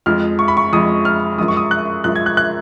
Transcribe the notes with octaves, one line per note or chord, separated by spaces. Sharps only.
F2 F3 G#3 F6
C#6
B5
C#6
F2 F3 G#3 D#6
F6
F#2 F3 G#3 D#6
C#6
D#6
F#6
F#2 F3 G#3 F#6
G#6
F#6
F#6